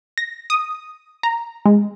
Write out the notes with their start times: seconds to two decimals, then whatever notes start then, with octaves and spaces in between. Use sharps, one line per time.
0.18 A#6
0.50 D#6
1.23 A#5
1.66 G#3